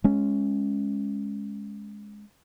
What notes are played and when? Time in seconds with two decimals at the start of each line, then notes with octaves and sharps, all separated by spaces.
0.04 G#3 C#4